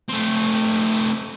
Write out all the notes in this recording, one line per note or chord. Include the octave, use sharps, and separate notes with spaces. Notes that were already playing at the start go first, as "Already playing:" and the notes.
A3 C4